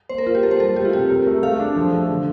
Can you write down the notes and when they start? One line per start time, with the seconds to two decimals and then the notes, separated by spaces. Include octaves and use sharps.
0.09 A#3 C5
0.18 A#4
0.26 A#3 F4
0.35 G4
0.43 A#3 A4
0.51 C5
0.60 G3 A4
0.76 A3 G4
0.85 F4
0.93 C3 G4
1.10 A#4
1.27 A3
1.43 A3 F5
1.60 D4
1.76 F3
1.92 A3
2.09 D3